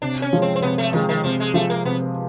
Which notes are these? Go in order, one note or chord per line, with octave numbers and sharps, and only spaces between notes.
C3 D4
C#4
F3 G#3
C4
C4
C3 B3
A3
D#3 F3 G#3
D#3
C3 F3
G#3
F3 G#3 A3
A#3
C3 B3